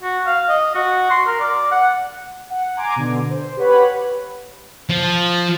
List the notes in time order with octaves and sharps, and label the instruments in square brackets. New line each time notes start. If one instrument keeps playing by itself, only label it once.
[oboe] F#4
F5
D#5
F#4
C6
A#4
D5
F#5
[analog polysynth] F#5
G#5 A#5 C6 D6 G#6
B2 D3
C5
G4 B4 C#5 F#5 B5
[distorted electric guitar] F3